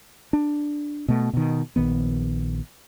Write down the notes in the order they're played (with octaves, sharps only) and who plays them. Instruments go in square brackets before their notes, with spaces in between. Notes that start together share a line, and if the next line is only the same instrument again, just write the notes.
[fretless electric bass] D4
B2 A3
B2 D#3
A#1 D#3 B3